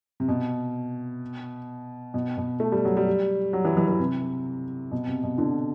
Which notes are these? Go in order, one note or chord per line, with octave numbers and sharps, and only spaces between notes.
C3
B2
B2
B2
A3
G3
F#3
G3
F#3
E3
E3
E3
C3
B2
C3
B2
D3